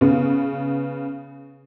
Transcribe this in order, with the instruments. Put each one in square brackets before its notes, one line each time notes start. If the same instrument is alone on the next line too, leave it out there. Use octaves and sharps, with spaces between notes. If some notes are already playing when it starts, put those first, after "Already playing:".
[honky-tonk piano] C#3 B3